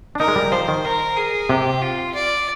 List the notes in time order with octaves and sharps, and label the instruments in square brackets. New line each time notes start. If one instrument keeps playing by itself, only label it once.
[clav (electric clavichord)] D4
[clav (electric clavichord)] D#4 [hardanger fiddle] A#4
[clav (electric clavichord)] G#3
G3
[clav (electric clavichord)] F3 [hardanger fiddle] C5
[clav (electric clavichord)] D#3
[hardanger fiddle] A#4
G#4
[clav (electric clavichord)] C3 [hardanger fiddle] G4
[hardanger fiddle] F4
D5